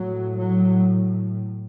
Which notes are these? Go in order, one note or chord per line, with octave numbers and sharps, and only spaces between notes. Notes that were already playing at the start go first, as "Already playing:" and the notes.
Already playing: A2 F#3
F#3